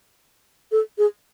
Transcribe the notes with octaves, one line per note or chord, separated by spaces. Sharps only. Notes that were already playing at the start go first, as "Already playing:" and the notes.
A4
G#4